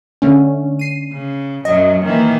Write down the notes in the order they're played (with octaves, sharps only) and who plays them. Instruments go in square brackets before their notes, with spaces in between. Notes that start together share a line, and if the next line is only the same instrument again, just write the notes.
[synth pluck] D3 A3 C#4
C7 D#7
[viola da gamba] C#3
[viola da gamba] F#2 F#3 [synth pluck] D#5
[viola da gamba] D#3 E3 A#3